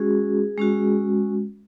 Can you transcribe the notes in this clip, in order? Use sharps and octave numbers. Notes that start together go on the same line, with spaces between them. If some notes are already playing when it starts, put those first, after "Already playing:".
Already playing: G#3 C#4 F#4 G#4
G#3 C#4 F#4